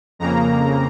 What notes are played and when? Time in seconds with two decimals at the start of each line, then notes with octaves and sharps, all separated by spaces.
0.19 F2 C#3 A#3 A#5